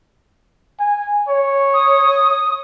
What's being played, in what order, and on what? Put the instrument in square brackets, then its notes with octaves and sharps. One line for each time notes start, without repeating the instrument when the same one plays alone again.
[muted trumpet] G#5
C#5
[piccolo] D#6